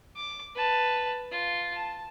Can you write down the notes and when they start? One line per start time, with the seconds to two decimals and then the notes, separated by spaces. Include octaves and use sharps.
0.16 D6
0.56 B4 A5
1.31 F4
1.75 A5